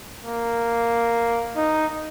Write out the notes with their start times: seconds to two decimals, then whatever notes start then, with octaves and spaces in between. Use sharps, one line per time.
0.25 A#3
1.56 D#4